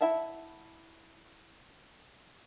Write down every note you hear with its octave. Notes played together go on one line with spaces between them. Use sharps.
E4 E5 F#5 A5